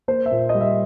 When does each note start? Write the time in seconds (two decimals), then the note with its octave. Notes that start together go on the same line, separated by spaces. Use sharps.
0.08 A#3 C5
0.26 E5
0.31 A#2
0.49 D#5
0.55 G3
0.61 E5